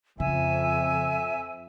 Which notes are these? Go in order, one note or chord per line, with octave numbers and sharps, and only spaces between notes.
F2 C#3 E5 G#5